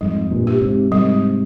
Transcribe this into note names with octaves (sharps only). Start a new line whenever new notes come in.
F2 G#2 G3
G2 A#2
G4
G#2 C3
G#2 C3 G3